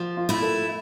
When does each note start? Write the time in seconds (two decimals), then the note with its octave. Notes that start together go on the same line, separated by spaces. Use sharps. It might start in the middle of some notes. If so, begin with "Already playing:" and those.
Already playing: F3
0.17 F4
0.29 A3 E4
0.42 A4